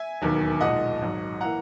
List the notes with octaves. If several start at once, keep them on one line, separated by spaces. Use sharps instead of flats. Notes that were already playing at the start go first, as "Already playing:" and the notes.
Already playing: E5 G#5
E1 D#2 D#3 F#3 B3
B1 A#2 G#3 D#4 D#5 F#5
G#1 G#2 F#3
E3 A#3 E4 F#5 A#5